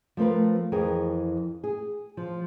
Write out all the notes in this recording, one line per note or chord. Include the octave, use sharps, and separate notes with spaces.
F3 A3 C4 A#4 B4
F2 E3 G#4 A#4
G#4
F3